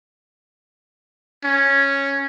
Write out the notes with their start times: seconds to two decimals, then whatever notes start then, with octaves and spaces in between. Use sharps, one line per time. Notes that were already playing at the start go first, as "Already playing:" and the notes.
1.45 C#4